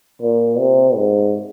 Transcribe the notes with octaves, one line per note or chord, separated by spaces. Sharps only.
A#2
C3
G#2